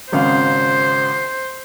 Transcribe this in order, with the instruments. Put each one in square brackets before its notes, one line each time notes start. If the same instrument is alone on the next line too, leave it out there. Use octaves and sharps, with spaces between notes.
[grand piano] G#1 C#3 F5 [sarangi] C5